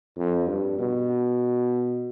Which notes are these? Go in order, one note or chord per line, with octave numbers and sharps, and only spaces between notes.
F2
G2
B2